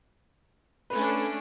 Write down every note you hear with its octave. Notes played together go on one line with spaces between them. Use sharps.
A3 C#4 D4 B4